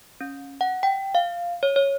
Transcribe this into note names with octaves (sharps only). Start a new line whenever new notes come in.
C#4
F#5
G5
F5
C#5
C#5